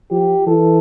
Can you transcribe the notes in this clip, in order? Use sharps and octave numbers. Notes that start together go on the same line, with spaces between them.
F3 G4
E3 A4